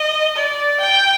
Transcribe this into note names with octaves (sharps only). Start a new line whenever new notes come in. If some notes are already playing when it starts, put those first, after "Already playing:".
Already playing: D#5
D5
G5